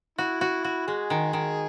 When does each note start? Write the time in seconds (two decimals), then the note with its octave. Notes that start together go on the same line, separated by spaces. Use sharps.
0.18 E4 F#4
0.41 F#4
0.64 F#4
0.87 G#3 G#4
1.10 D#3
1.33 D#3